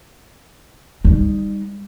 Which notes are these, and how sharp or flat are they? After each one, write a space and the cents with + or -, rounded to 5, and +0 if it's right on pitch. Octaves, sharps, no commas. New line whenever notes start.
G3 +30 D#4 +0